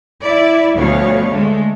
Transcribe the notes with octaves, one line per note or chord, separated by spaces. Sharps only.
E4 D5
D2 B2 F3 G3 C#5 F5
D3 G#3 A3